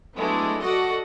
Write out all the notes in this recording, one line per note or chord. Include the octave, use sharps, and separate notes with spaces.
F#3 G#3 A3 B3 D4 E4
F#4 A4 D5 D#5 F#5